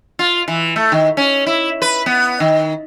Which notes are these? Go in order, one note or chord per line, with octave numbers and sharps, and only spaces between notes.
F4
E3
A3
D#3
C#4
E4
B4
B3
D#3